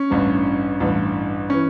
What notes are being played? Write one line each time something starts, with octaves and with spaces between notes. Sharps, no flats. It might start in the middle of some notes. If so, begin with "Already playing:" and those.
Already playing: C#4
A1 G2 E3
A1 G2 E3
E3 C#4